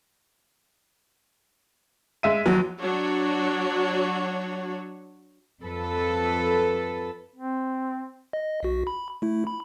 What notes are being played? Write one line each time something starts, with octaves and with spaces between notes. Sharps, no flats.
G#3 E5 D#7
D#2 F#3
F#3 D4 F#4 C#5
F2 A4 B4
C4
D#5
B1 F#4
B5
A3 E4
B5